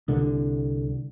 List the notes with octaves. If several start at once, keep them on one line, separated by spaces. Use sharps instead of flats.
C2 D3